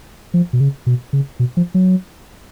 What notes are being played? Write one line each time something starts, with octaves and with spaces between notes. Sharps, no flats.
F3
B2
C#3
B2
C#3
B2
F3
F#3